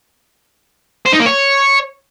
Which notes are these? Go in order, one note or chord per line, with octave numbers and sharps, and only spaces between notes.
C5
D#4
A#3
C#5